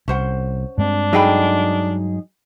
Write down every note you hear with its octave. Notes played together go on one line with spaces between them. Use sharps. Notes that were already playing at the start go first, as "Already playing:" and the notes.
C2 C#4 C5 F#5
G2 G#3 C4 D4
F#3 D#4 G#4 A4 G5 B5